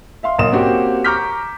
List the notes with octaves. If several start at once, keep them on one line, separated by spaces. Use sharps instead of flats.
E5 F5 C6
B1 A#3 C6 D#6 E7
A#3 C4 C#4 F#4 G4
A#5 C#6 D6 F6 G6 B6